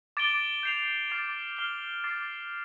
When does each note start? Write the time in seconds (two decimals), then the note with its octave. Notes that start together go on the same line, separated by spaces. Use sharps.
0.17 D6 A6 D7 G7
0.63 G6 C7 F7
1.10 D6 F6 A6 C7 F7
1.57 F6 C7 G7
2.04 D6 A6 C7